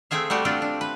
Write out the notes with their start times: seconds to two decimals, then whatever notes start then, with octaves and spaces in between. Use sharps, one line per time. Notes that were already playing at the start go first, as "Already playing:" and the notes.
0.11 A3 C4 G#4 E5 F5
0.30 G3 A3 F#4 G4
0.45 A3 C4 D4 F4 D5
0.62 D4
0.81 B4